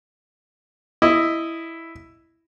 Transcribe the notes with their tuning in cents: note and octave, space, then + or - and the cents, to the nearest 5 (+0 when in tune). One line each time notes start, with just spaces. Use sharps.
E4 +0 D#5 +0